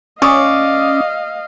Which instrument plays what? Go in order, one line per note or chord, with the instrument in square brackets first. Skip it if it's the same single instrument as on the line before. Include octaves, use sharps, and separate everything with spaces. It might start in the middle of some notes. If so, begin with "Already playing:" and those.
[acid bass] C#4 [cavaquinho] D5 [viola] D#5 F5 [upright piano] C#6 D#6